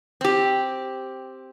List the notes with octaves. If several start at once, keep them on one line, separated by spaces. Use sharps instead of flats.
C4 G4